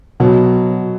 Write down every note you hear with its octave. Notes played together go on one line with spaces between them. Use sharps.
B2 F#3